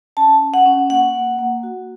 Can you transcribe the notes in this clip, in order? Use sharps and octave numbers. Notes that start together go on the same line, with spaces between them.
C#4 A5
C#4
F#5
C#4
A#3 F#5
A#3
A#3
F#4